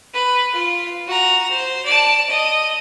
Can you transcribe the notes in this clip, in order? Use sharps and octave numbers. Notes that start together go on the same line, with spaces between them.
B4
F4
F#4 A#5
C5
D5 A5
D#5